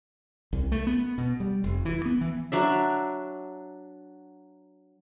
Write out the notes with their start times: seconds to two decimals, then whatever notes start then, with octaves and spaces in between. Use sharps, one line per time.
0.53 C2
0.72 A3
0.87 B3
1.18 B2
1.40 G3
1.64 F1
1.85 E3
2.06 B3
2.21 E3
2.52 F#3 D4 E5